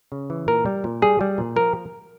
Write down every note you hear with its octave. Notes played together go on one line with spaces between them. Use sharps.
C#3
E3
A#2 A#4
G3
A#2
G3 G#4
G3
A#2
F3 A#4